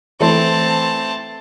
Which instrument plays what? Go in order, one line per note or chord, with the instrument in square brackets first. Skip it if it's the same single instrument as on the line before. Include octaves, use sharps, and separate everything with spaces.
[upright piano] E3 A3 C5 [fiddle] C4 A5